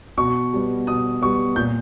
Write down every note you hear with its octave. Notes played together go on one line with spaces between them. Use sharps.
B2 C#6
G3 B3
B2 D#6
G3 B3 C#6
A#2 G6